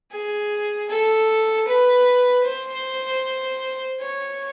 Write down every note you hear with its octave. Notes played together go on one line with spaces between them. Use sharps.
G#4
A4
B4
C5
C#5